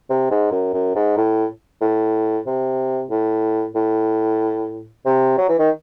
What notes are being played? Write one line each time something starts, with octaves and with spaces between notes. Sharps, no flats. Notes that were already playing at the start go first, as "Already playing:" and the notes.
C3
G#2
F#2
F#2
G#2
A2
A2
C3
A2
A2
C3
F#3
E3
D#3